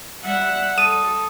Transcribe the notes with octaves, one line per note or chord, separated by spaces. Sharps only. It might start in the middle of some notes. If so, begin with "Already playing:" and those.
G3 E5 F#5
A4 D#6 D#7